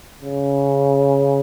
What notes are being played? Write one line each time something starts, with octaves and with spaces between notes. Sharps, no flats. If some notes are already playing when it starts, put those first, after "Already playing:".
C#3